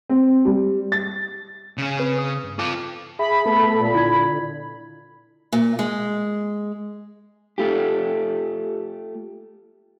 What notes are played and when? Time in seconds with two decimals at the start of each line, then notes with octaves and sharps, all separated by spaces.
0.09 C4
0.45 G3
0.92 A6
1.78 C#3 C#4
1.99 C4 B4
2.19 D#6
2.43 G2
2.59 F4 A4 D6
3.19 G#4 E5 B5
3.46 A3 B3 A4
3.73 A#2
3.94 D3 E4 G#6
5.52 A#2
5.79 G#3
7.58 A3 F4 G4